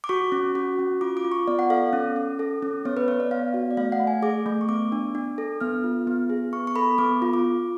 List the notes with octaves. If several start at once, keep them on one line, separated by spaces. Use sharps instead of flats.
D6
F#4 C#6
C#4
F#4
C#4
F4 D6
D6
F4
C#6
B3 D5
F#5
A4 F5
C#4
C#4
A4
C#4
B3 C#5
B4
B3 C#5
D5
B3 F5
F#4
D5
A3 F5
F#5
A3
G#5
G#4 D6
A3
C#6
B3 D6
D4
D4
A4
B3 F6
F4
B3
G#4
B3 C#6
C#6
A4 B5
B3 D6
F4
D6
F4